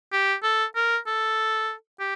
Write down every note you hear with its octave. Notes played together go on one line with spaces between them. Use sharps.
G4
A4
A#4
A4
G4